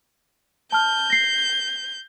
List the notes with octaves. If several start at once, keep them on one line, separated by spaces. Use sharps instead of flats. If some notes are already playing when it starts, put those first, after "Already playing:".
A5 F6 G6
A#6 C7